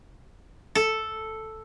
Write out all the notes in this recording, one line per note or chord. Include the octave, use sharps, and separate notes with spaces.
A4